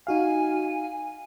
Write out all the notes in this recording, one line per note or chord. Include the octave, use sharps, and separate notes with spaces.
D#4 F#4 F5 G#5